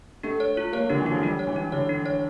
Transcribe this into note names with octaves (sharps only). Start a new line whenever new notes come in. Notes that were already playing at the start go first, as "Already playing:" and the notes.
A3 D4
C#5
F4
A#3 C#5
D3 D4
E3
D4
F3
G3 D4
C#5
E3
D4
D3 C#5
D4
C#5